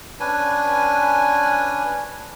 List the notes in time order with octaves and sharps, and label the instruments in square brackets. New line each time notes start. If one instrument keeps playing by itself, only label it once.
[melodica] C#4 D4 B4 G#5